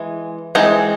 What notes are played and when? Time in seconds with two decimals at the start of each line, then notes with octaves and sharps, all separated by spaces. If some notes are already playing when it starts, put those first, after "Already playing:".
Already playing: E3 G#3
0.55 E3 G#3 C4 D#4